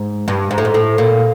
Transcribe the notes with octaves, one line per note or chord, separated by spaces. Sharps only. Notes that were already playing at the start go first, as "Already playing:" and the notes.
Already playing: G#2
G2
G#2
A2
G#2
A2
A#2